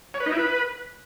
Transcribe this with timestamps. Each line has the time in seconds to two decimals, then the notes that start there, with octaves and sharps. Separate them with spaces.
0.14 C#5
0.20 B4
0.26 D#4
0.32 E4
0.38 B4